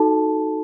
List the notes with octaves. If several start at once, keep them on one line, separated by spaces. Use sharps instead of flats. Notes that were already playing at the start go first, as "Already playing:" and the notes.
Already playing: D#4 F#4 A4 A5